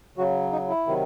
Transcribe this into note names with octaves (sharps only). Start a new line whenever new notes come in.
C#3 F#3 F#4
D#4
E4
C3 D#3 F#3